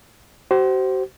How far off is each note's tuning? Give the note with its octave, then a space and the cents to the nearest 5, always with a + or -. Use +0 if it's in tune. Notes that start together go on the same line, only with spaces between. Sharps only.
F#4 +45 C5 +0